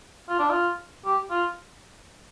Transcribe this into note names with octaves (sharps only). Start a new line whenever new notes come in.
F4
D4
F4
G4
F4